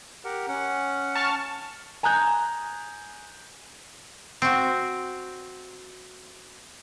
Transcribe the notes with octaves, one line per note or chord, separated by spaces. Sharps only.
G4 A#4 F#5
C#4 F#5
A5 C#6 F6
G#5 A#5 D#6 F#6 G6
C4 F#4